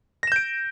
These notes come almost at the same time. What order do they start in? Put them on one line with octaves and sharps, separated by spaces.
A#6 E7 G6 D7